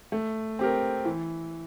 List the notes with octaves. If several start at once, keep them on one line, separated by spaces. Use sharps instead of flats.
A3
C4 G4 A#4
E3